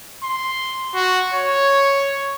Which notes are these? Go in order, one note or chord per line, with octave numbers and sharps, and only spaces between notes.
C6
F#4
C#5